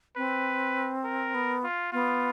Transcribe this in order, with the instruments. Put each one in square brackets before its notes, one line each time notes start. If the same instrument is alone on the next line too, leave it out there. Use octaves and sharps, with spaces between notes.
[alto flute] C4 [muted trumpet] B4
[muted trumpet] A#4
[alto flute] B3
[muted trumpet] F4
[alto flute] B3 [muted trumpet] F4